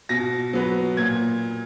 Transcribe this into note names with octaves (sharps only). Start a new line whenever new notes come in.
B2 A#6
F#3 B3
A#2 G#6